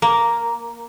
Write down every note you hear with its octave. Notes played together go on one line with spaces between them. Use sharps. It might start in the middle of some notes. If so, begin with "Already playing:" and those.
A#3